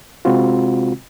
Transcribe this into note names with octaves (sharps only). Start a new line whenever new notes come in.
C3 G#3 C4 F4 F#4